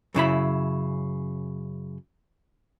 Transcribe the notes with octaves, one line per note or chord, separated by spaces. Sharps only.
F#2 C#3 E4 B5